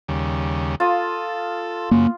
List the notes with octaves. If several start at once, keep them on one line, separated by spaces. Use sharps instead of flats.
D#2 C#3 G3
F4 A4 D#6
F#2 C#3 A#3